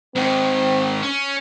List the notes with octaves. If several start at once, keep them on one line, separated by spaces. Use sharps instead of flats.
G#2 D#3 C4
C#4